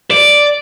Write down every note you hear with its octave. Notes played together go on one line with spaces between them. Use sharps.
D5